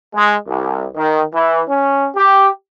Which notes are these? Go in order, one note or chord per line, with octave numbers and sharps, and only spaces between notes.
G#3
C2
D#3
E3
C#4
G4